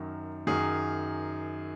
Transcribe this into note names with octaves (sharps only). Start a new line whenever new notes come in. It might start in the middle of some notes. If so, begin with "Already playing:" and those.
Already playing: F#2 D#3 F#3
F#2 D#3 F#3 G#4